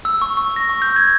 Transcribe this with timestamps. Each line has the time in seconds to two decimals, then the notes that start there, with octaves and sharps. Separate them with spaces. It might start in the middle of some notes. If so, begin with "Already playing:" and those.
0.05 E6
0.22 C#6
0.37 C#6
0.56 A#6
0.69 C#6
0.82 G6
0.96 G#6